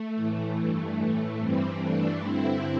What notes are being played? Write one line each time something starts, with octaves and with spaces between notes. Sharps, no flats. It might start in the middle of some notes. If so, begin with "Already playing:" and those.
Already playing: A3
A2 E3
G2 E3
A2 E3 A3
G2 E3 G3 C4
G2 E3 A3 D4
G2 D3 C4 E4